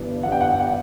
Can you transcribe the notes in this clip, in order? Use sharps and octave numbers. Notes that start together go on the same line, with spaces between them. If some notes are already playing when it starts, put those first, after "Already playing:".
Already playing: G1 G2 E3
G1 G2 E3 F#5
G5
F#5
G5
F#5